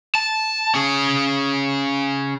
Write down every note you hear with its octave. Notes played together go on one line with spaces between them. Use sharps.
A5
C#4 G#4